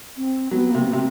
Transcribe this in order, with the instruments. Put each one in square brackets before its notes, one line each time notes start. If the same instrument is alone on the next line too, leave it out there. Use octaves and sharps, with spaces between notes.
[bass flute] C4
[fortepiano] F#3 [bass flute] B3
[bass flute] A#3
[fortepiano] C3
[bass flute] A3
[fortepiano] C3